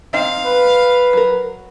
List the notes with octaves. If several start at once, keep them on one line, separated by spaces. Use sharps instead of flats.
C4 D#4 D#5 F5
B4
F#3 A#4